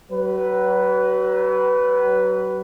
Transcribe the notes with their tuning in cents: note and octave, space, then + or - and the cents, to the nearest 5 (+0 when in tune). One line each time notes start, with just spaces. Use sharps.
F#3 +40 B4 +0